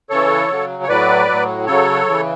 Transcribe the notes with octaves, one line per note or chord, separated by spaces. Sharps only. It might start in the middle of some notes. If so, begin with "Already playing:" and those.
C#3 E3 A4 C#5
C#3 F#3
C#5
A2 F#3 B4 D5
A2 F#3
C#3 F#3 A4 C#5
C#3 E3